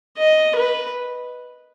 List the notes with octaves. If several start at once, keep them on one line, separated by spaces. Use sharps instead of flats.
D#5
B4